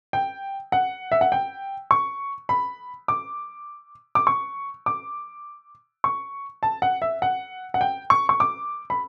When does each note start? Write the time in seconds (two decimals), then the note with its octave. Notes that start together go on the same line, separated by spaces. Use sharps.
0.13 G5
0.72 F#5
1.12 E5
1.21 F#5
1.32 G5
1.91 C#6
2.49 B5
3.08 D6
4.15 D6
4.27 C#6
4.86 D6
6.04 C#6
6.63 A5
6.82 F#5
7.02 E5
7.22 F#5
7.74 F#5
7.81 G5
8.10 C#6
8.29 C#6
8.40 D6
8.90 B5